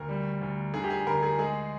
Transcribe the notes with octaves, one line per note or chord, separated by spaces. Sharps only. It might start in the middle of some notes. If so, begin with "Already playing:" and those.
Already playing: D2 A#4
G3
D2
D3 G#4
G4
G#4
D2 A#4
G#4
G#3 G#4